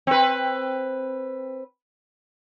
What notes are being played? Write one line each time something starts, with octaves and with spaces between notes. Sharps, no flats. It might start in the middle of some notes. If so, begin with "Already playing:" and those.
C4 B4